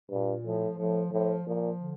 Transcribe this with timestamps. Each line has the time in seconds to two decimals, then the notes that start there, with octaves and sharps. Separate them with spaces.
0.10 G2 A#2
0.44 A2 F3
0.78 A2 F3
1.12 A2 F3
1.46 A#2 F3
1.80 D3